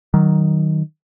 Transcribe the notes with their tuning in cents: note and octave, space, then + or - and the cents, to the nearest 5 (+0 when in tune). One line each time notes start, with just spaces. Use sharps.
D#3 +0 F#3 +25